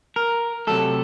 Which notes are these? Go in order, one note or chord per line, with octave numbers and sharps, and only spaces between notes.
A#4
C3 F#3 A3 A4